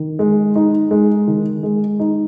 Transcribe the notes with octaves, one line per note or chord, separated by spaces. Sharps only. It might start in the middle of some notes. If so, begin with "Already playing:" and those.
Already playing: D#3
G#3
D#4
G#3
D#3
G#3
D#4